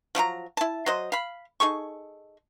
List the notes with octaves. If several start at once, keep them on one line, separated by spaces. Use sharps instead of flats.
F3 F#3 F#4 A#5
E4 A5
F#3 C5 D#5
F5 B5
D#4 G#4 A4 C#6